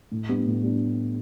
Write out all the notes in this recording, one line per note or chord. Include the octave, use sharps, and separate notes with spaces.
A2
G3 B3 D4
A2
G3 B3 D4